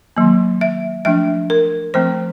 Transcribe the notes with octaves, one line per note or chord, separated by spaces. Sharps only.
D#3 F#3 A#3
E5
F3 A3 D4 E5
A#4
F3 A3 C4 C5